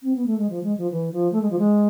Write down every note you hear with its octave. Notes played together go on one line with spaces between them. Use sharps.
C4
B3
A3
G#3
F3
G#3
F3
E3
F3
A3
G#3
F3
G#3